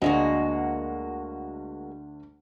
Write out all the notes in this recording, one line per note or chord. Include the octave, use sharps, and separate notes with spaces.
D2 G#3 A#3 D4 F#4